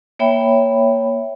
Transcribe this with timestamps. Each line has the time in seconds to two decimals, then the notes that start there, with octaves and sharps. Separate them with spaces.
0.19 A#3 C#5 E5 G5 B5